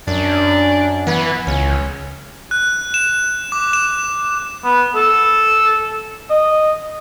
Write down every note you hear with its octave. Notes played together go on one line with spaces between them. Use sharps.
F#2 D4
E3 B3
C#2 C#4
F#6
E7
D6
E7
B3
A4
D#5